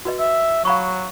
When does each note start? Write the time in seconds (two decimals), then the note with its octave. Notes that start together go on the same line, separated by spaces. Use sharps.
0.05 F#4 B4 D#5
0.20 E5
0.65 F#3 F5 B5 C#6